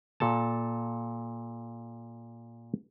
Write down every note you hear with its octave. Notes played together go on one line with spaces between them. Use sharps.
A#2 A4 A5